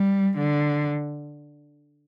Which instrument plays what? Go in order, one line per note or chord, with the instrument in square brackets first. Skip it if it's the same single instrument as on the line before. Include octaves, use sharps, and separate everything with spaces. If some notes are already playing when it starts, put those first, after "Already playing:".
Already playing: [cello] G3
D3